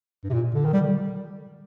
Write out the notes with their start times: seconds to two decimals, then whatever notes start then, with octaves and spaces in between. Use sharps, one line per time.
0.24 G2
0.30 C3
0.34 A#2
0.55 D3
0.65 D#3
0.73 G3